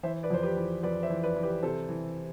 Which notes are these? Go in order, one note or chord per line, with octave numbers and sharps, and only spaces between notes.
E3 C5 E5
B4 D5
F2 C5
G4 B4
E3
F2 B4 D5
C5 E5
E3
B4 D5
E3
G4 B4
C3 A4 C5
E3